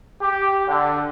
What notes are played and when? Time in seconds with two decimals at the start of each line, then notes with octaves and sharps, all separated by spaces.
0.21 G4
0.68 D3